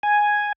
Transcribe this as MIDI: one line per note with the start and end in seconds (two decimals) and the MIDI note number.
0.03 0.52 80